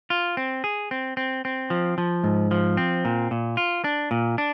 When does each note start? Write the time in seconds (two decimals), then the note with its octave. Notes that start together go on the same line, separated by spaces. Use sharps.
0.10 F4
0.37 C4
0.64 G#4
0.91 C4
1.17 C4
1.45 C4
1.70 F3
1.98 F3
2.24 G#2
2.51 F3
2.77 C4
3.05 A#2
3.31 A#2
3.57 F4
3.84 D4
4.11 A#2
4.38 D4